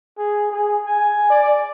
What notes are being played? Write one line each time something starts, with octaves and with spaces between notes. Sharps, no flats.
G#4
G#4
G#5
D5